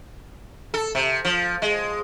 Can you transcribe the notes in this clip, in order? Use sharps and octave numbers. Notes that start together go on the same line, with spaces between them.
A4
C3
F3
G#3